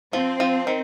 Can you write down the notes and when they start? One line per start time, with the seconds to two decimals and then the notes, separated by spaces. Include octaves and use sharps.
0.13 F3 C4
0.40 F3
0.67 D#3